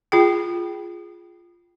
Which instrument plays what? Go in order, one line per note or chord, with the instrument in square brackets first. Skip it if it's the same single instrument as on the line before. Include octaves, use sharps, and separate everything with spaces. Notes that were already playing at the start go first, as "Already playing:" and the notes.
[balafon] F4 G#4 G5